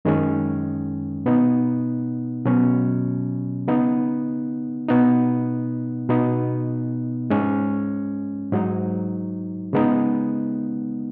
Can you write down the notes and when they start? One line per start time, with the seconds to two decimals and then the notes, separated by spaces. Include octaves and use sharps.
0.05 F#2 D#3 G#3 C#4
1.26 B2 B3 D#4
2.46 B2 F#3 C#4
3.68 C#3 B3 D#4
4.88 B2 B3 D#4
6.09 B2 B3 D#4
7.30 G#2 G#3 C#4
8.53 G#2 F#3 D#4
9.73 C#3 G#3 B3 D#4